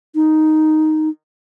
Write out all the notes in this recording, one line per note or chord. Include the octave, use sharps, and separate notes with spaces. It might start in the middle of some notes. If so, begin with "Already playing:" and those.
D#4